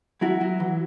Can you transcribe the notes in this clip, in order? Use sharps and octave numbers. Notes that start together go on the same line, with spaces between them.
F#3 E4 F#4
F#3
E3